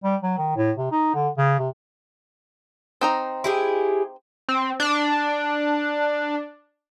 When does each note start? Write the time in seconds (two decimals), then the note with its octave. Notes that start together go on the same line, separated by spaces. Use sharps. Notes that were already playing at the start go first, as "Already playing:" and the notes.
0.04 G3
0.23 F#3
0.38 D#3
0.56 A2
0.77 C3
0.91 D#4
1.14 D3
1.37 C#3
1.59 C3
3.01 C4 D#4 A#5
3.44 E4 G4 G#4
4.49 C4
4.80 D4